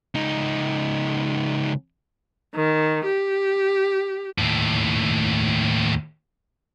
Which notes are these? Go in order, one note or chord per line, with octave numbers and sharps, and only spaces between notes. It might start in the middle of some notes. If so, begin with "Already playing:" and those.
C#2 D#4
D#3
G4
D#2 A2